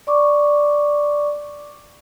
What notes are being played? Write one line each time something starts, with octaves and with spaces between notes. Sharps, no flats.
D5 C#6 D6